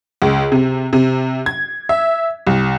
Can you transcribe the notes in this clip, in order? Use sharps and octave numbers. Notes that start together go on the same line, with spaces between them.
C#2
C3
C3
G#6
E5
C2